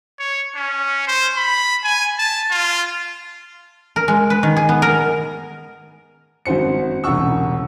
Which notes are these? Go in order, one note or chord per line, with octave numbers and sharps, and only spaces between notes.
C#5
C#4
C5
B5
G#5
A5
F4
A#4
G#3
B4
D#3
G#4
B3
A#4
G#1 F#2 F#4 C5 C#7
E1 C2 C#3 F#5 C#6 E6